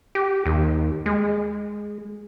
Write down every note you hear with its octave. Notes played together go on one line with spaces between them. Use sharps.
G4
D#2
G#3